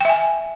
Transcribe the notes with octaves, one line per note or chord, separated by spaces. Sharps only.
E5 G5 G#5